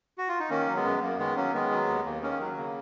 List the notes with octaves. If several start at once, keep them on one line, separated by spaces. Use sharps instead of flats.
F#4
F4
D#4
D#3 A#3 C#4
F#3
G#3 B3
F#2
F#2 A#3
D#3 G#3 B3
F#3 A#3 C#4
D#3 G#3 B3
F#3
D#2
D#2 A#3
D#3 A#3 C#4
F#3
C#3 A#3